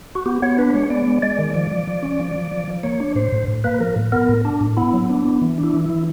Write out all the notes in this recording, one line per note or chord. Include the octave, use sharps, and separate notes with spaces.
F#4
B3 G4
B3 C#5
D4 B4
G#3 C#5
B3 D5
G#3
G#3 D5
D#3
F3 D5
F3
F3
C#4
F3
F3
F3
F3
A#3 C#5
D4
A2 C5
A2
A2
A#3 B4
F3 A#4
A2
B3 A#4
A2
D4
A2
B3 E4
F#3
B3 D4
B3
E3
D4
E4
E3
E4
E3